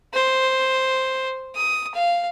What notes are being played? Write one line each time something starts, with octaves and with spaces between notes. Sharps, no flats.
C5
D#6
F5